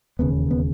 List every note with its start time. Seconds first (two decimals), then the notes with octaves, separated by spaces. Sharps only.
0.19 E1 D#2 C#3 B3
0.51 B3